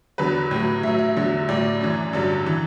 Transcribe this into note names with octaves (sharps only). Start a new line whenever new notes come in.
E2 D3 F#3 B4
A2 F#3
A2 F#3 E5
E5
E2 D3 F#3
A2 F#3 D5
F#2 E3
G2 D3 F#3
E3